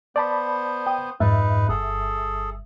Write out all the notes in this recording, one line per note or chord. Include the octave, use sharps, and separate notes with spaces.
B3 C5 D5 A5 B5
G5 D#6
F2 G#2 D#4 B4 E5
G1 G#4 A4